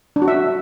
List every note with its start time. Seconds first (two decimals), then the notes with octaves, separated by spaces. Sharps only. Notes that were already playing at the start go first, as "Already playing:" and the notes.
0.16 D4
0.22 F#4
0.28 E5